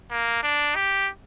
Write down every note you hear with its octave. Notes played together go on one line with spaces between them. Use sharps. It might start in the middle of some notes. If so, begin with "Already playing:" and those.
A#3
D4
G4